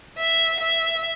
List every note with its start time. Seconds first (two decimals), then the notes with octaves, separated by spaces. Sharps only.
0.18 E5
0.60 E5